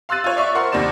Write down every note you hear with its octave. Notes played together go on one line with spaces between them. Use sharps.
F5 C6 E6 F#6 A6 D#7
F4 C#5
D5 E5 C#6
A#4 C5 F#5 C6
D#2 C3 G3 D5 E7